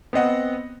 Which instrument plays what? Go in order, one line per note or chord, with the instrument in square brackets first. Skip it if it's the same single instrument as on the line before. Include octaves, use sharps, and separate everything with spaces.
[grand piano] B3 C4 D#5 F#5